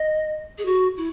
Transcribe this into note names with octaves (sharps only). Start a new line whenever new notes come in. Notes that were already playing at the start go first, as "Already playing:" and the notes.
Already playing: D#5
G#4
F#4
E4